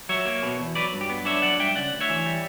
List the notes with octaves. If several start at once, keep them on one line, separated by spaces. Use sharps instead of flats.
F#3 C#5 E5
A#3
B2
E2
F#3 B4 D5
G2
G4
B3
D4 C#5 E5
F#3 D5 F#5
G2 E5 G5
C#3 D5 F#5
D2
C#5 E5
E3
G3